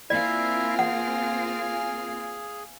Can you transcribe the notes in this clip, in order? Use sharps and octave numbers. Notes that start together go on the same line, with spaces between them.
A#3 C4 E4 F4 D5 E5 F5 G#5
G#4 F#5